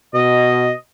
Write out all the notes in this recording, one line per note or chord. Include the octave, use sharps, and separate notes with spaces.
B2 D#5